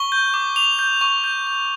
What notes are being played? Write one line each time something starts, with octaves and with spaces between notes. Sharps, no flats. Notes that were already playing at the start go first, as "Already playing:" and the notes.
Already playing: C#6 G7
G6
D6
D6 F7
G6
C#6
G6
G6